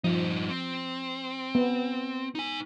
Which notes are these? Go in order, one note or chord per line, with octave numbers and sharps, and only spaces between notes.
G2 F3 D#4
C4
B3
D#4 G#5